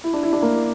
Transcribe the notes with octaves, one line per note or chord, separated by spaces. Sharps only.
E4
D4
E4
D4
A#3